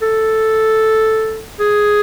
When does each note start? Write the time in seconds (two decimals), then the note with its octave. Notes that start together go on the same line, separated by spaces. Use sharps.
0.02 A4
1.60 G#4